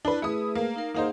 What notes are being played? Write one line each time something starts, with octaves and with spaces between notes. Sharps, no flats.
D4 E4 B4
A3 E4 G#4 B4 D#6
A#3
D#4 A#4
A#3 D#4 G#4 C5 F5 F#5